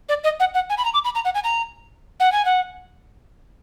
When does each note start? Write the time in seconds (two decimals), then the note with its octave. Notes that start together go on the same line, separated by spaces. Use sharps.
0.09 D5
0.24 D#5
0.40 F#5
0.54 F#5
0.70 G#5
0.78 B5
0.85 A#5
0.94 D6
1.04 B5
1.15 A#5
1.25 F#5
1.35 G#5
1.44 A#5
2.20 F#5
2.32 G#5
2.45 F#5